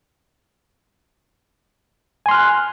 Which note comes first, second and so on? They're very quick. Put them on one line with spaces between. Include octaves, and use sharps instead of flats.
G#5 C6 F6 F#6